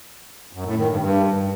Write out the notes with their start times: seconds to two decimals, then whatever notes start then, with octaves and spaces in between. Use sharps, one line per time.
0.53 F#2
0.65 A2
0.77 D#3
0.88 G2
1.00 G2